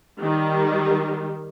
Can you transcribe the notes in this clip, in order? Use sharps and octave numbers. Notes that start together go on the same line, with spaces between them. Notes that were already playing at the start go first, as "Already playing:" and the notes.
D#3 G3